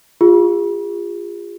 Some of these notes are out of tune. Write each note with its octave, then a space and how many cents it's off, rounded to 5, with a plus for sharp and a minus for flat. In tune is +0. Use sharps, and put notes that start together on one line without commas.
F4 +0 G#4 -35